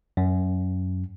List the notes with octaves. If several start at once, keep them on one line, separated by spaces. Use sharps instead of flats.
F#2